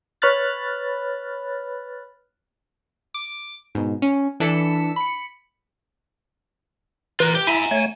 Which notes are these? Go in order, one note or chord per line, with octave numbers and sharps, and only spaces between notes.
B4 C#5 B5 F6 F#6 A6
D6
G#2 B2
C#4
E3 D4 A4 B6 C#7 E7
B5 C#7
E3 F4 A#4 B4
G4
E4 E5 G#5 A#5
A3 C#5